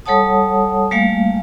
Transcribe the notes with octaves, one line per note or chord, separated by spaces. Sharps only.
G3 A4 C#5 F#5 A5 D#6
G3 A3 A#3 F5 G#5